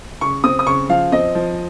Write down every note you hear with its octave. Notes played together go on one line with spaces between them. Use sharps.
C#3 C#6
C4 D#6
D#6
C#3 C#6
F3 F5
C4 D#5
F3